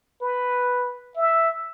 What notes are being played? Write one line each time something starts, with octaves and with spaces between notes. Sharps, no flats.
B4
E5